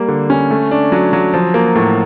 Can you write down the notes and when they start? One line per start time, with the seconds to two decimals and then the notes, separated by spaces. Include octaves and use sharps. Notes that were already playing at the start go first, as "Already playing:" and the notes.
Already playing: G3 A#3
0.08 D3
0.30 C#4
0.50 A3
0.71 D4
0.92 F#3
1.13 F#3
1.34 F3
1.54 A#3
1.75 A2